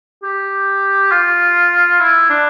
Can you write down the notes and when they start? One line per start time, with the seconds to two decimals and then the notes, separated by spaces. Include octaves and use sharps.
0.23 G4
1.11 F4
2.00 E4
2.30 D4